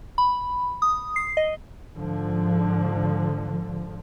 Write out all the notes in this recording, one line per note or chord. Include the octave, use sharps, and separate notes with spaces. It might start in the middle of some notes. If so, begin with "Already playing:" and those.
B5
D#6
C7
D#5
G#2 D3 F3